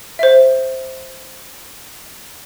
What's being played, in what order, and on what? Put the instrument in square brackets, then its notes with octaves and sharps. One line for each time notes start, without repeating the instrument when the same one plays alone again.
[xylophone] C5 E5